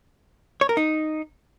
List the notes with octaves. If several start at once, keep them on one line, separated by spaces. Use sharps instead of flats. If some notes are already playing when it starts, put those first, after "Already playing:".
C#5
A#4
D#4